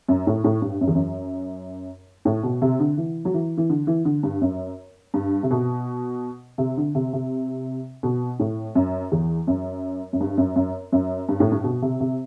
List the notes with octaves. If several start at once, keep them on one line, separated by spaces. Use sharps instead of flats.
F#2
A2
A2
G2
F#2
E2
F#2
A2
B2
C3
D3
E3
F#3
E3
E3
D3
E3
D3
G2
F#2
G2
C3
B2
C3
D3
C3
C3
B2
A2
F#2
E2
F#2
F#2
G2
F#2
F#2
F#2
G2
A2
G2
B2
C3
C3